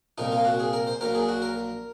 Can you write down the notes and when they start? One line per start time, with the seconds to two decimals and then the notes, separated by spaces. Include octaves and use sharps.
0.18 C2 A#2 F3 D#4
0.32 F4
0.45 F#4
0.60 G#4
0.73 A#4
0.87 C5
1.01 A#1 A#2 F#3 A#4
1.15 G#4
1.29 F#4
1.42 A#4